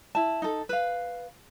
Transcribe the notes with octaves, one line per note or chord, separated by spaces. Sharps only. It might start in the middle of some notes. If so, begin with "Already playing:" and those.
E4 A5
D#4 A4
B4 F5